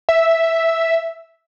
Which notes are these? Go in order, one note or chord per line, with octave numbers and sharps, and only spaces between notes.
E5